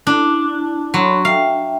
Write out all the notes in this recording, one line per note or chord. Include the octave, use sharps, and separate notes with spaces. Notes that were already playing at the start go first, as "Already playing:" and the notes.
D4 E4 A5
F#3 C#5 B5 C6
E5 F5 G5